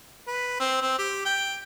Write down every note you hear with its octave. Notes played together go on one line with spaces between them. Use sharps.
B4
C4
C4
G4
G5